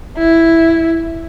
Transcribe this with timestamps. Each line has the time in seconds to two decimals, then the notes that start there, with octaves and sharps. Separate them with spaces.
0.18 E4